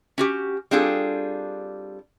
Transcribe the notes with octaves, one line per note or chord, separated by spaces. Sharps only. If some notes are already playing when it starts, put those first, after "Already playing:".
C#4 F#4 G4
G3 C4 D4 F4 G#4 A4